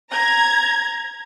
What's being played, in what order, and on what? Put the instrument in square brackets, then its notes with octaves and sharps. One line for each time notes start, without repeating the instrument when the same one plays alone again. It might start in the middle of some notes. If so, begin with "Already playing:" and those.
[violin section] A#5 G#6